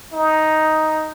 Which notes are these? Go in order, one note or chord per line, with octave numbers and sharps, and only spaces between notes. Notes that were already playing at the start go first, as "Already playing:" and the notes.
D#4